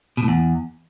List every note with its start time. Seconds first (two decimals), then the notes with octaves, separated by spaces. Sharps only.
0.17 B2
0.23 A2
0.28 E2